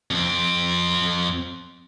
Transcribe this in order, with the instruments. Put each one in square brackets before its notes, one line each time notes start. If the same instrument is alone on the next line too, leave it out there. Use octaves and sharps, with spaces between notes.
[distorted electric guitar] F2 C4